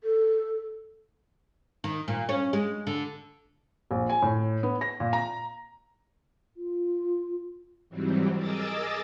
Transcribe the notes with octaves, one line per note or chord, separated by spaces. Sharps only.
A4
D#3
A#2
C#4
G#3
D3
A#1
G#5
A2
B3
A#6
A#2
A#5
F4
G#2 E3 F#3 G3 C4
G#4 A#4 D#5 D6 E6 A6